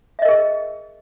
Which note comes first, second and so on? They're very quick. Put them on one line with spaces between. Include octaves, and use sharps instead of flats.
E5 D#5 A#4 G#4